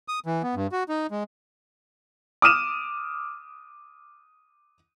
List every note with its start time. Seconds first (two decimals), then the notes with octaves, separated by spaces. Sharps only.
0.08 D#6
0.26 E3
0.43 B3
0.55 G2
0.72 F#4
0.89 D#4
1.11 G#3
2.42 D6 D#6 F6 D#7 E7